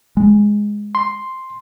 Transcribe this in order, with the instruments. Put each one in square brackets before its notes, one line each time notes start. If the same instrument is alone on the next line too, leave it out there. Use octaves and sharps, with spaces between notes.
[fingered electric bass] G#3
[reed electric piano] C6